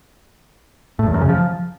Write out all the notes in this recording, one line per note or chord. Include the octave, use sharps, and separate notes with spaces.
A2
E2
F#2
C#3
F3